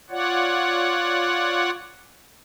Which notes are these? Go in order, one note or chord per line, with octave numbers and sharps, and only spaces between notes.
F4 C#5 D5 F#5